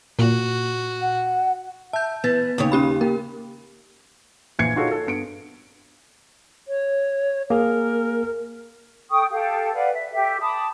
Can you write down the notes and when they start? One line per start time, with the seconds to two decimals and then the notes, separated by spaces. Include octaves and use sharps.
0.19 A#2 F#4
1.01 F#5
1.93 E5 A5 G6
2.24 E3 B3 B4 A6
2.58 D#2 C#3 C#5
2.72 C#4 G4 B5
3.01 A#3 G4 A#4
4.59 A#1 A#2 E3 G#6 C7 C#7
4.76 D#4 F4 F#4 G#4 A4 C#5
4.91 A4
5.07 G2 B3 C#7 D7
6.68 C#5
7.50 A#3 G#4 A#4
9.10 A4 G5 C#6 D#6
9.30 G4 A4 F5 G5
9.73 B4 D5 F5 F#5
9.93 E5
10.12 G4 A4 E5
10.40 A5 B5 D6 D#6